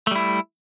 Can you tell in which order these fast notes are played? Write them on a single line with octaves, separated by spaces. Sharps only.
A3 G3 E4